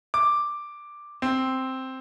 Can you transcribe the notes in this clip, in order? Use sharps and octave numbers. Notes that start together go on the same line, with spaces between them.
D6
C4